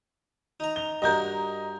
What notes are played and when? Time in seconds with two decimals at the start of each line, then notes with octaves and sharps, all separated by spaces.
0.60 D#4 A#5
0.76 G7
1.02 G2 F#4 A#4 D#5 A#5 G6